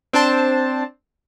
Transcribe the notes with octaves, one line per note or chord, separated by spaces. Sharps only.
C4 D4 C5 A5